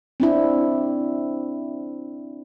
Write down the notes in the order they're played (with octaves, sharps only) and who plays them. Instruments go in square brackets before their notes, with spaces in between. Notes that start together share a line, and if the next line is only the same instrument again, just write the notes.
[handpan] C4 D4 E4